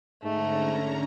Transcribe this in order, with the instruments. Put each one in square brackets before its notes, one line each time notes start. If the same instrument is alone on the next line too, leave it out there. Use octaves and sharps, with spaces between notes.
[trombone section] G#2 [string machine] D3 C#4 A#5 [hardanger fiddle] A3